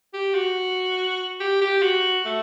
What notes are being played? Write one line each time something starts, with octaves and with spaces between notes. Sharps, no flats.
G4
F#4
G4
G4
F#4
A3